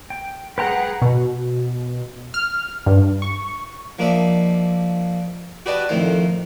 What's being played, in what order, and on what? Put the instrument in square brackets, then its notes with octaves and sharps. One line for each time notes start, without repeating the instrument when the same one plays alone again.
[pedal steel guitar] G5
[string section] G#3 G#4 F#5 [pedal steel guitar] B4 G5 A#5
[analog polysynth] B2
F6
G2
C#6
[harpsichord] F3 A#3 D4 D#5 E5
F#4 G4 B4 D5 D#5 A5
F2 A2 D#3 C5